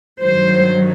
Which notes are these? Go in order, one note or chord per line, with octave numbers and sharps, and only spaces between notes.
G2 D#3 F#3 C5